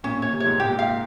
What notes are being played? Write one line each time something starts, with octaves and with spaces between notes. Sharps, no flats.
A#2 C#4
A#2 C#5
C3
C#5
G#2
A#2 G4
F5